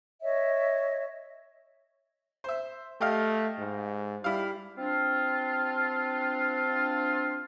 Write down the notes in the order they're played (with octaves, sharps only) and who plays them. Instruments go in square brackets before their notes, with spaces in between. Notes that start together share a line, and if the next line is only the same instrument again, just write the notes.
[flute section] C#5 D#5 E5
[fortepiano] C5 E5
[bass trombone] A3 [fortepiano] G4 D#5 F5
[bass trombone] G#2
[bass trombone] G3 [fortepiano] E4 F5
[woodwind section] C4 D4 F4